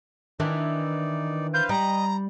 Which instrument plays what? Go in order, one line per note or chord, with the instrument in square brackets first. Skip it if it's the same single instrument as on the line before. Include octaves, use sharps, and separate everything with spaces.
[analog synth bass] D#3 [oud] E3 D4 [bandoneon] D#4 D5
[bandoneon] B4 C5 F5 [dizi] G6
[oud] G3 [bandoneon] D#5 [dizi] A#5